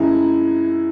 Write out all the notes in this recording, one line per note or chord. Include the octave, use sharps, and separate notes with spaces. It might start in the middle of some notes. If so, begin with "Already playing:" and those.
Already playing: F#2 E3 G#3 E4